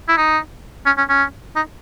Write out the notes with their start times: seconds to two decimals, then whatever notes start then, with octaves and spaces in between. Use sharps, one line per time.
0.08 E4
0.17 D#4
0.86 C#4
0.98 C#4
1.09 C#4
1.56 D#4